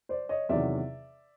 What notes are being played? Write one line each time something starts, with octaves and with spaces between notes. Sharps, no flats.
C5 D5
C#5 D#5
E2 C3 D#3 F#3 D5 E5